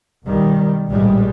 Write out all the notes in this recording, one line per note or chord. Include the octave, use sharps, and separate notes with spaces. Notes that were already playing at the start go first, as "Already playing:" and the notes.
B1 D#3 G3
A#1 A2 G3 G#3